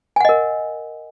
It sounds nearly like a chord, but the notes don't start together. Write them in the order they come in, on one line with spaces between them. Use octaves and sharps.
G#5 F#5 D#5 A#4